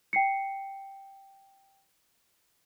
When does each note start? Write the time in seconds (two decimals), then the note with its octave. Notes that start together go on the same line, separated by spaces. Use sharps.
0.13 G5 C7 C#7